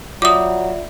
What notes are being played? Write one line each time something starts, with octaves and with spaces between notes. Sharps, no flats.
F#3 F4 D5 E5 D6 D#6